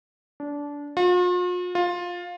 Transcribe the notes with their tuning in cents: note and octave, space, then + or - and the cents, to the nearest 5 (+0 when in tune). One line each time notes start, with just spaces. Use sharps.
D4 -20
F4 +45
F4 +15